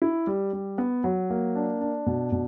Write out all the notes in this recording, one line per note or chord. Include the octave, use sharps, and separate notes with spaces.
E4
G3
G3
B3
F#3
A#3
D4
D4
B2
B2